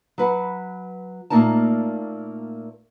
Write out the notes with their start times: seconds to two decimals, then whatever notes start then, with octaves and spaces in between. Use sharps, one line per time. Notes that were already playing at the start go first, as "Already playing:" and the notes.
0.18 F#3 B4 F#5
1.30 A#2 A3 A#3 D#4 A#4 A5